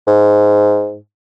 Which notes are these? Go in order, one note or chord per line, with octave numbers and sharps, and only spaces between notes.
G#2